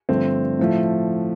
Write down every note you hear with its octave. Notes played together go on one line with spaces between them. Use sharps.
G2 D3 F3 A3 C4
A2 F3 A3